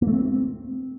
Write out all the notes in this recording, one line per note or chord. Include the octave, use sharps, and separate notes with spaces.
A#3
A3
C4